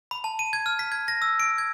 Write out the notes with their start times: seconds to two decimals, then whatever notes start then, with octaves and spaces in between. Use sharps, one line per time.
0.11 B5
0.24 A5
0.39 D#7
0.53 G#6
0.66 F6
0.79 B6
0.92 G#6
1.08 A#6
1.22 E6
1.40 D7
1.58 G#6